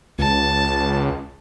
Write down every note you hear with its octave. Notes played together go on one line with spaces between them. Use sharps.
C#2 A5